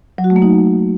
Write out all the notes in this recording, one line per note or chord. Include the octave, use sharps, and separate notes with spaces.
F#3
F#4
A3
A#3
D#4